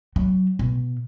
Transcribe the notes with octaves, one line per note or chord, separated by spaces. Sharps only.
F#3
B2